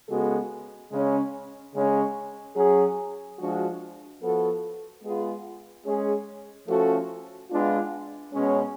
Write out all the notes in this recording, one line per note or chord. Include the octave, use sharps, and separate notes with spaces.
C#3 G#3 B3 F#4 A4
C#3 G#3 C#4
C#3 G#3 C#4
F#3 C#4 G#4
F3 G#3 D4 F#4
F3 B3 F#4 A4
G#3 B3 F4 G#4
G#3 C#4 G#4
F3 A3 C#4 F#4 A4
G#3 B3 D4 F4
B2 G#3 C#4